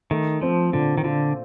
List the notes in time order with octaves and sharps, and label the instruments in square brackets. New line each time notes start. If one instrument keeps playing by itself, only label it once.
[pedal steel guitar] D#3 [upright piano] A3
[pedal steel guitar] F3 [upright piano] C4
[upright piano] A#2 [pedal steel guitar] D3
[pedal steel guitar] D#3
[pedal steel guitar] D3 [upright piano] F4